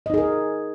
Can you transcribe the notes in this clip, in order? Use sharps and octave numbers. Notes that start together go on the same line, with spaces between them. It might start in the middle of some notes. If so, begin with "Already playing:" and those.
D#4 G#4 A#4 D#5